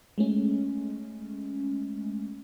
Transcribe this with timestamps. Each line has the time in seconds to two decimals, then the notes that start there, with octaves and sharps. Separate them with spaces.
0.18 G#3 A3 C#4